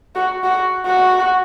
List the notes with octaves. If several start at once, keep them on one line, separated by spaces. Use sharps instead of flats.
F#4
F#4
F#4